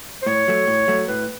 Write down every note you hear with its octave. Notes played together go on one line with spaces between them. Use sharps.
C5
A2 C#5
F#3 A3
A2
F#3 A3
A2 B4